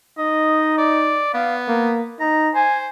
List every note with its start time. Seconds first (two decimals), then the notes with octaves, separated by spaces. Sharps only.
0.18 D#4 D#5
0.78 D5
1.34 B3 F5
1.68 A#3
2.20 D#4 A#5
2.55 C5 G#5